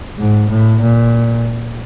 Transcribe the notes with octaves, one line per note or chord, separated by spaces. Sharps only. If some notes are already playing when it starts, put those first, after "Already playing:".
G#2
A2
A#2